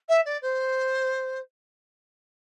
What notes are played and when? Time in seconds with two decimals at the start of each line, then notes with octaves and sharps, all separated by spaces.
0.09 E5
0.25 D5
0.42 C5